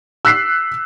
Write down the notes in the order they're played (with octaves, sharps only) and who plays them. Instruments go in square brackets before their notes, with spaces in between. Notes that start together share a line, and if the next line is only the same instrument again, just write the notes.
[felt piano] E6 F#6 B6 C7